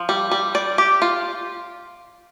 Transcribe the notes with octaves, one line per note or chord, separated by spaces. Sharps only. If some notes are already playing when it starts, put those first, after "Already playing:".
Already playing: F3
G3
G3
D5
G4
F4